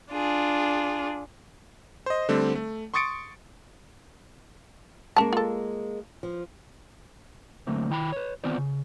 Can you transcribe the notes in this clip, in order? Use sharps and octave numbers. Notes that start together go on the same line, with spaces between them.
D4 F4 G#4
C5 D#5
D3 G3 A3 C4
A3
C6 C#6 D#6 A6 C#7 D7
G#3 A#3 C#4 A5
F4 A4
F3
D3 F#3 A3 A#3 C4
D#3 E4 G5 A#5 B5
B4 C#5
D#3 B3 C4 F4 C5 D5
C#3